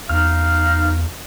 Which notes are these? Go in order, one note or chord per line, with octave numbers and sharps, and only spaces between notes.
E2 D#4 F5 F6